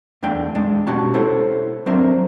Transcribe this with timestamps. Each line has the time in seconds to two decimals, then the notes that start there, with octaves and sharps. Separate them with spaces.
0.23 E2 A3 D4 G5
0.55 G#3 D4 D5
0.87 B2 C#4 F#4 G4 A5
1.14 E4 A4 C5 C#5
1.86 F#3 C4 D4 A#4 C5 E5